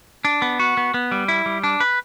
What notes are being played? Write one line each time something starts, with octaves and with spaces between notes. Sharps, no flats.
D4
B3
F#4
B3
B3
G3
E4
G3
D4
B4